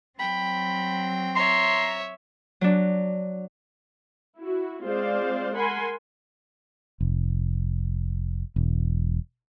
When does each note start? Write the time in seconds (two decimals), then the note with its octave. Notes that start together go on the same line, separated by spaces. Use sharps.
0.19 F#3 C4 G5 B5
1.36 C#5 E5 A#5 C6
2.61 F#3 D4
4.38 E4 F#4
4.84 G#3 C4 F4 C5 D5 F5
5.55 A#4 F#5 G#5 B5 C6
7.00 F1
8.56 E1